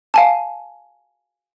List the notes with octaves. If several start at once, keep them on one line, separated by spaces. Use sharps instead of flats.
F5 G#5 A5